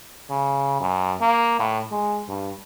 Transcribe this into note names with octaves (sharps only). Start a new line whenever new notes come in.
C#3
F#2
A#3
A2
G#3
G2